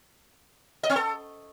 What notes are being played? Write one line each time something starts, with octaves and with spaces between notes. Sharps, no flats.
D#5
C4
A4